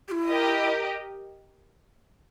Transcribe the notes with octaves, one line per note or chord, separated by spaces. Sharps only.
G4
E4
G4 A#4 D#5